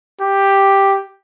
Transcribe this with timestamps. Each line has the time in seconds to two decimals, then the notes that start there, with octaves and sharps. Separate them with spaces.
0.21 G4